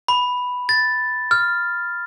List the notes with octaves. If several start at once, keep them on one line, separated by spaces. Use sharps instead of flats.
B5
A6
F6